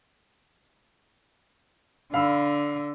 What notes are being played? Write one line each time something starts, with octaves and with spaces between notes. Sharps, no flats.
D3 F5 B5 E6